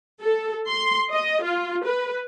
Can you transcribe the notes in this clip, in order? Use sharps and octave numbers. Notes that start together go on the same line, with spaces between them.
A4
C6
D#5
F4
B4